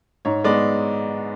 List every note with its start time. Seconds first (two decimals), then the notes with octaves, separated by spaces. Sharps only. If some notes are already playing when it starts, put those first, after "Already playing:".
0.25 G#2 C#5
0.44 G#3 B3 D5